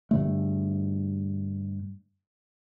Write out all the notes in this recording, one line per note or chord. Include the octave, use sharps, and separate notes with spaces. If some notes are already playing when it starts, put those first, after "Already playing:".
G2 D3 A3